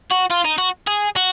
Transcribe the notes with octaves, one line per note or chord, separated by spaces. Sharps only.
F#4
F4
D#4
F#4
G#4
F#4